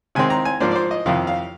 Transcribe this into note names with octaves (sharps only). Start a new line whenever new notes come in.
C3 D#3 G#3 C4 G#5
A#5
G#5
G#2 F3 A#3 D4 C5
D5
C5
D#5
F2 C3 D#3 F5
F5